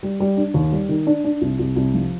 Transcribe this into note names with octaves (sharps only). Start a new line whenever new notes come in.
G3
G3
D4
D#2
G3
D#3
D4
D4
C2
C2
C2
F3